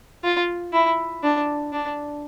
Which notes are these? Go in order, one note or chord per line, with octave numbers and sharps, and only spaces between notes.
F4
E4
D4
D4